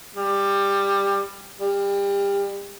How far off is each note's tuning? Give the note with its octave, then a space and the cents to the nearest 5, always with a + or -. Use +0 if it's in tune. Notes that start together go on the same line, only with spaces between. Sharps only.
G3 +15
G3 +30